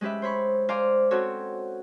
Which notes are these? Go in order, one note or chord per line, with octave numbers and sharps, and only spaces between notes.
G#3 C#4 G4 B4 E5
C5 C#5 B5 C#6
C5 D5 F5 G#5 A#5 D6
C4 C#4 F#4 A4 C#5